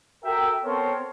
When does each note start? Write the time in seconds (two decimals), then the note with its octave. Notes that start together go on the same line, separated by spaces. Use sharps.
0.24 F#4 A4 A#4 E5 G5
0.65 B3 C4 A4 A#4 C5 C#5